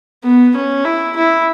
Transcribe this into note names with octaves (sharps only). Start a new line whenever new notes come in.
B3
C#4
E4
E4